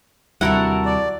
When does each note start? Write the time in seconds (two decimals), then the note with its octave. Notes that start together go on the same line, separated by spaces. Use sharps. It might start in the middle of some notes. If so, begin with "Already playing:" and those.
0.41 D#2 C3 G3 E4 F#4 A4 A#4 F#5
0.85 D5